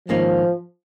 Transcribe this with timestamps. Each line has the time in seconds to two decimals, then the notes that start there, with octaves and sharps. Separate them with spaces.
0.09 G#2 D#3 F3 A#3 C#4